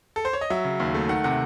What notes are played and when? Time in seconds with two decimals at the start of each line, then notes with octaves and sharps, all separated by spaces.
0.16 A4
0.25 C5
0.33 C#5
0.41 D#5
0.50 F#3 E5
0.65 C#3
0.80 D#2
0.95 A3
1.09 D#3 F#5
1.24 C3 F#5